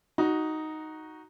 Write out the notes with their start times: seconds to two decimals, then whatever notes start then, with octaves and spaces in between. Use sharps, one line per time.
0.18 D#4 F#4